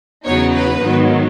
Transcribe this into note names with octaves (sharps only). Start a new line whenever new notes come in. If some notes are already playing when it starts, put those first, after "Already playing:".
E2 C#3 F#3 B3 D#4 C#5
B4
G#2 D#3 F#3 B3